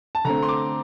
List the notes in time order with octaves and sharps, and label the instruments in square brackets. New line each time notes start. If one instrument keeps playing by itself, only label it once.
[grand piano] A5
D3 A3 C4 A#5
C6
D6